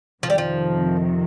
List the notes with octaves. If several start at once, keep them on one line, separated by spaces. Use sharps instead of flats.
F2 C3 D#3 F3
G3
F3